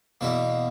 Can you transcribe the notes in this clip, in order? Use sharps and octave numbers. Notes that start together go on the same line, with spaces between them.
E2 B2 A#3 E4